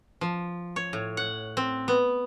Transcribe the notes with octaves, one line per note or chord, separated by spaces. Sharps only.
F3
C#5
A2
F#5
C4
B3